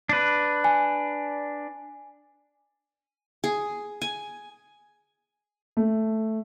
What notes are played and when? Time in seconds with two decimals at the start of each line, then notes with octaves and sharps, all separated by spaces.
0.09 D4 B4
0.64 G#5
3.44 G#4
4.02 G#5
5.77 A3